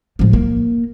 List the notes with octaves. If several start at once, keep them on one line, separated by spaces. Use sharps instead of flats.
A2 F3
A#3